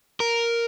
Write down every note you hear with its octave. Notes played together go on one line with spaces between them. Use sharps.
A#4